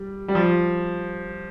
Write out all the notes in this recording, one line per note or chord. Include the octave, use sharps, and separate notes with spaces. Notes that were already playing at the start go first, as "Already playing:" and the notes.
Already playing: G3
G3
F3